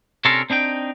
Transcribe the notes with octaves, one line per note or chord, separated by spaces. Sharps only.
C3 C#4 D4 A4 A#4 C6
C4 D4 D#4 G5